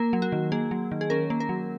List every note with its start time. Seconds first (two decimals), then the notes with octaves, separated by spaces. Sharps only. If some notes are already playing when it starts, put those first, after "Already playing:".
Already playing: A#3 A#4
0.13 F#3
0.22 F#4
0.32 D#3
0.52 A#3 G#4
0.71 F#3
0.92 D#3
1.01 G#4
1.10 C#4 A#4
1.30 A#3
1.40 A#4
1.49 F#3